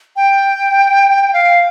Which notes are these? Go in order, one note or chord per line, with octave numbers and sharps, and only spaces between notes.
G5
F5